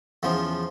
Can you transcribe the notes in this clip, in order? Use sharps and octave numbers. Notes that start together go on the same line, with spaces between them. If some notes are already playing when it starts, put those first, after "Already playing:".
E2 C#3 F3